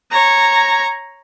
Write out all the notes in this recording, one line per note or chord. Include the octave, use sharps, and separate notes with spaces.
C#5 A#5